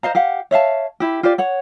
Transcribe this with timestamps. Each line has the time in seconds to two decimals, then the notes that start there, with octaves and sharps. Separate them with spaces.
0.03 C5 D#5 F5 A#5
0.15 G4 F5 F#5
0.51 C#5 E5 F5 A5
1.00 E4 G4
1.23 F4 G4 C5 D5
1.38 C#5 F#5